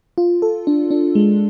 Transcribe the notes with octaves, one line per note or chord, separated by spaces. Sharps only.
F4
A4
D4
D4
G#3